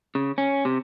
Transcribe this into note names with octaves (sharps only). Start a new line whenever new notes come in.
C#3
C#4
C3